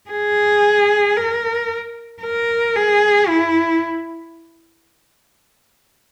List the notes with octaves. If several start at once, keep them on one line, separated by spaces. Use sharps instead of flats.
G#4
A#4
A#4
G#4
E4